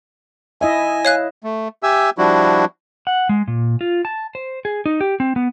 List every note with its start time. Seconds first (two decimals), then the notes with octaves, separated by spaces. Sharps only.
0.61 E4 D#5 E5 G#5
1.05 C#5 F5 F#6
1.44 A3
1.83 G4 E5 G#5 E6
2.18 F3 G3 D4 E4 F#4
3.07 F#5
3.29 G#3
3.48 A#2
3.81 F4
4.05 A5
4.35 C5
4.65 G#4
4.86 D#4
5.01 G4
5.20 C4
5.36 B3